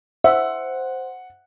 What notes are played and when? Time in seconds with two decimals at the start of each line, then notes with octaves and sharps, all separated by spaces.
0.24 C5 E5 F#5